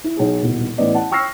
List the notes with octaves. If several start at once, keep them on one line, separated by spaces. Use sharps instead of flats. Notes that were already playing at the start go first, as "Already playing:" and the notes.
E4
B1 G#4
D#1 C2 B2
A1 E3 B3 D5 D#5
F#5 A5
G5 C#6 E6 F6 A#6 C7